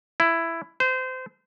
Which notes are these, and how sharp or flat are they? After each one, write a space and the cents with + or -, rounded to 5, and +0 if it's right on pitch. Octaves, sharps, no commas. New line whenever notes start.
E4 +10
C5 -25